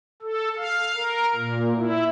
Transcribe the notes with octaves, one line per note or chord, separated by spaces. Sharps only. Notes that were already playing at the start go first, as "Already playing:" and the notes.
A4
F5
A#4
A#2
E4